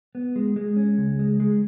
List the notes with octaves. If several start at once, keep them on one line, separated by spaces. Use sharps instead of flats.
B3
G#3
G#3
C#4
C#2
G#3
G#3